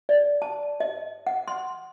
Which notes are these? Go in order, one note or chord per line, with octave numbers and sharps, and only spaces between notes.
D5
A5
D#5
F#5
C6